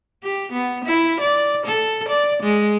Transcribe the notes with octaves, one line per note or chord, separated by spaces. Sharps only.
G4
B3
E4
D5
A4
D5
G#3